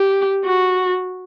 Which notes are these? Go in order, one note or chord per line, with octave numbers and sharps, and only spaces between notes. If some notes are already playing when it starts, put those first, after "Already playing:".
Already playing: G4
F#4